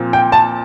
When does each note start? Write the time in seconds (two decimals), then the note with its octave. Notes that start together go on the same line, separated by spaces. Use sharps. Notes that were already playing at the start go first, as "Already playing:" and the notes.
Already playing: A#2 F3 C4
0.13 G5
0.32 A5